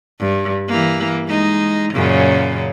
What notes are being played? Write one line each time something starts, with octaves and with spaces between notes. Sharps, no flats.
G2
E3 A#3
G#3 D#4
F#2 A#2 C#3